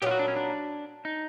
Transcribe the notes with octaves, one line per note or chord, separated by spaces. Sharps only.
A#2 F#3 B3 D#4 F4 G4
F#4
D4
C#4
D4
D#4